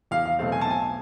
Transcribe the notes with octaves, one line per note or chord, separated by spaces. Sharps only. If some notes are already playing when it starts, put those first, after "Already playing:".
E2 F5
F5
B2 F#3 A3 C4 F5
G#5
A5
B1 G#5